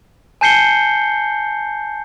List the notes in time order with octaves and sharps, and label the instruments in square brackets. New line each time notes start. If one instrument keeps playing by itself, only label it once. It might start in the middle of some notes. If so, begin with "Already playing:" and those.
[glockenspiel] G#5 A5 G6 C7 C#7 G7